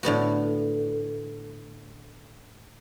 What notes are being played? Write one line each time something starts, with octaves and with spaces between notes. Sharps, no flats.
A2 D3 B3 F#4